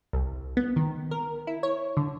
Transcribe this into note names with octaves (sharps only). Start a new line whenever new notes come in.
C2
B3
D#3
A#4
E4
C#5
D3